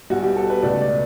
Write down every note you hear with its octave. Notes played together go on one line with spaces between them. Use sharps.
B1 B2 G3 F#4
G4
A4
B4
C#2 B2 A3 D5
D5